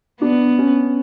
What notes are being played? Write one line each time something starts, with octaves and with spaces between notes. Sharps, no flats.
B3 D4
C#4